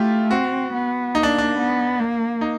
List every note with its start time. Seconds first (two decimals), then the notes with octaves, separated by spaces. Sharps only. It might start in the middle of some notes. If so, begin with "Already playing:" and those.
Already playing: A3 E4 F4 G4
0.31 C4 F#4
0.73 B3
1.15 A#3 D#4
1.23 D4
1.38 D4
1.58 B3
1.99 A#3
2.41 D#4